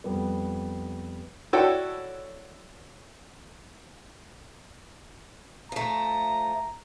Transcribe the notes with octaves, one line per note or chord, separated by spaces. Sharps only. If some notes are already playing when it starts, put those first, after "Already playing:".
F2 G3 B3
E4 F#4 A4 C#5 D5 G5
F3 A3 A#5